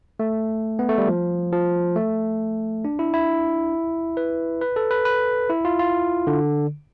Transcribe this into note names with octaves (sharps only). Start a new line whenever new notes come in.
A3
B3
A3
G3
F3
F3
A3
D4
E4
E4
B4
B4
A4
B4
B4
E4
F4
F4
D3